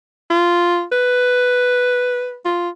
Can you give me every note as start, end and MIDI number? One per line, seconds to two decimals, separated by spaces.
0.30 0.83 65
0.92 2.36 71
2.45 2.69 65